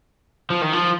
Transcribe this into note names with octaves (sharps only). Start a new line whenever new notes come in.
F3
D#3
F3